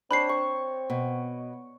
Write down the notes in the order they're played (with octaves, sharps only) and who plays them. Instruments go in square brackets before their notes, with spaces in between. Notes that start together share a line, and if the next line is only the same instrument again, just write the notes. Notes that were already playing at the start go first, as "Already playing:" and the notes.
[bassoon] C4 [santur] D4 C5 C#5 [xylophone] B5 C7
[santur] C#6
[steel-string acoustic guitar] B2